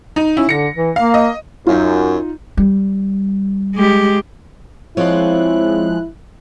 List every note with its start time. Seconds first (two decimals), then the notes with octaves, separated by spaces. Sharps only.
0.16 D#4
0.37 C#4 E4
0.49 D3 A#6 C#7
0.77 E3
0.96 A#3 F5
1.14 D#5
1.67 F#2 D#4 F4
2.57 G3
3.75 G#3 G4
4.97 F3 G#3 C4 E4 F4 C#5 F#6